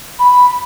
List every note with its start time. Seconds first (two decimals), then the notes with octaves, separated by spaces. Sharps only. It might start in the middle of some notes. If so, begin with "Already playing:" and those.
0.19 B5